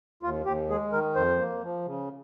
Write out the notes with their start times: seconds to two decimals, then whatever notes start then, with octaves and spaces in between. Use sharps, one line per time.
0.23 D#2 F4
0.46 D#2 G4
0.69 G#3 G#4
0.92 D#3 A#4
1.15 F2 C5
1.39 A#3
1.63 F3
1.85 C#3